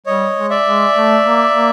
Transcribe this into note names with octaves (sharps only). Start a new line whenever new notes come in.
G3 C#5 D#5
G#3
D5 E5
G#3
A3
A#3
A#3